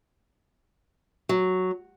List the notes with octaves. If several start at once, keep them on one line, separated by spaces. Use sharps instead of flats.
F#3